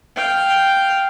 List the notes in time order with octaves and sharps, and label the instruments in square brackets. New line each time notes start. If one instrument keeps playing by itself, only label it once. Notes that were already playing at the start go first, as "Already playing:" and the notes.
[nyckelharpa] F5 G5